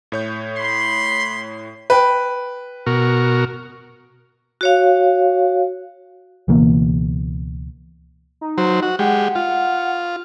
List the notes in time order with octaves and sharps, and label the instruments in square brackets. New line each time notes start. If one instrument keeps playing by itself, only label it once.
[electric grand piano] A2 C#5 G6
[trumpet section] B5 C6
[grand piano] B4 G5
[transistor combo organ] B2 F#4 A#4
[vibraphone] F#4 C#5 F5
[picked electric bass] C#2 B2 E3 A#3
[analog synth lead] D#4
[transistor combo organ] F#3 C5
F#4
[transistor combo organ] G#3 G4 [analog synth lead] F#5
[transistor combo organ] F4